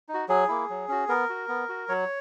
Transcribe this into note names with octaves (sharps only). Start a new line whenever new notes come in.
D#4
F#4
F#3 G#4
A#3 E4
F#3
C#4 F#4
B3 A#4
F#4
B3
F#4
F#3 C#5